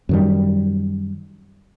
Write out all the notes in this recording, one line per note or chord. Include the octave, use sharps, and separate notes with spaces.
F#2 D#3 G3